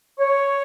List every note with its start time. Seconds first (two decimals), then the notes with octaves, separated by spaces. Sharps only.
0.19 C#5